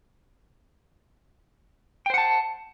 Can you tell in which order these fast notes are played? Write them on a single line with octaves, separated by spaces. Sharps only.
G5 C5 F#5 A5